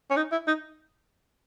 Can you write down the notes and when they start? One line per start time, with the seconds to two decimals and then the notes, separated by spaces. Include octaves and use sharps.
0.10 C#4
0.17 D#4
0.32 E4
0.48 D#4